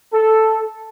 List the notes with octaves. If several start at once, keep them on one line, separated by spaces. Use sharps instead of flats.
A4